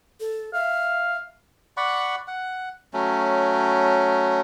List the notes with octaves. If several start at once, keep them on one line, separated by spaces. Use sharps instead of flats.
A4
E5 F5
D5 F#5 B5 C#6
F#5
F#3 A3 C#4